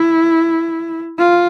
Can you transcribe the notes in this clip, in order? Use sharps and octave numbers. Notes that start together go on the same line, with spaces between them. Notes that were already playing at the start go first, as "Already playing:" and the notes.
Already playing: E4
F4